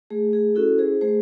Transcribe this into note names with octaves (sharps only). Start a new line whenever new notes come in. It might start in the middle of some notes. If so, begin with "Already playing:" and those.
A3 G#4
G#4
C#4 E4 F#4 A4
G#4 C5
A3 G#4 C5